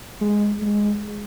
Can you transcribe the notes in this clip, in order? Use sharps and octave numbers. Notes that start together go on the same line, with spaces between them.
G#3
G#3